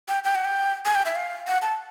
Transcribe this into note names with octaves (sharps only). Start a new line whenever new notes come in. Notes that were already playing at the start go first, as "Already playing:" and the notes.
G5
G5
F#5
G5
G#5
G5
E5
F5
F#5
A5